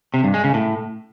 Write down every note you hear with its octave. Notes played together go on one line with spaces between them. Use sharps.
C3
G2
G#3
C#3
A2